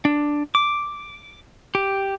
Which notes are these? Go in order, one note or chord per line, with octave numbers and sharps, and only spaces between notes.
D4
D6
G4